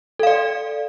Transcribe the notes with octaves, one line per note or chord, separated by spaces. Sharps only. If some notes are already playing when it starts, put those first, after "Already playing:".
A4 D5 F5